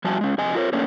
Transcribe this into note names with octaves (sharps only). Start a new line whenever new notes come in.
F3 G3 F#4 E5 G#5 A5
G#3 C#4
F2 C3 D#5 G#5
F4 A#4 C5 C#5
A3 A#3 C#4 D4